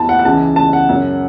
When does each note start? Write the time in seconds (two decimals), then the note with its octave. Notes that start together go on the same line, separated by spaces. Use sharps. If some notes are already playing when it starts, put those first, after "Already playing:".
Already playing: E2 E3 A5 B5
0.09 F#5
0.19 F#5
0.24 C#2 C#3 E3 A5
0.56 A5
0.73 F#5
0.89 F#2 C#3 F#3